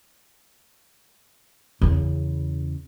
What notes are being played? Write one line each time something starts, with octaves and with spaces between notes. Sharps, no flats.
E2 C#3